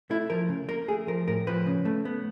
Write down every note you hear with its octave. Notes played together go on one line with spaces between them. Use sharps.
A3 E4
F3 A#4
C#3
A#3 A#4
A3 G#4
F3 A#4
A2 A#4
F3 B4
C#3
A3
B3